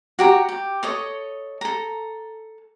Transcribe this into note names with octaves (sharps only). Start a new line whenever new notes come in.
F#4 G4 A#5
G4
A4 C#5 D#5
A4 A#5